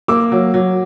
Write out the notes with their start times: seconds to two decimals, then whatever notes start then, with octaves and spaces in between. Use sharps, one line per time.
0.08 A#3 D6 E6
0.32 F#3
0.54 F#3